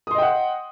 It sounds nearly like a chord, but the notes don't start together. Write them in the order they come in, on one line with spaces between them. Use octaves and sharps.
D#6 C6 D#5 G5 F#5